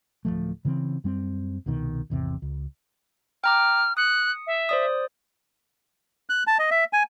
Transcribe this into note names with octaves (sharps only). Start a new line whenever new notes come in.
D1 E2 F3 A3
C#3 E3 G3 C4
F#2 G3 C4
C2 B2 D#3
G#1 E2 C3
C#2
G5 A#5 D6 F6
D#6 F#6 C#7
E5
C5 D5 D#6
F#6
A5
D#5
E5
G#5